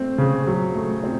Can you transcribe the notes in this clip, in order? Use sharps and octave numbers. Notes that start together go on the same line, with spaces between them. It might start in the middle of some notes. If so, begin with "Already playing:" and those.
Already playing: A3 C4
C#3
F#3
A3
C4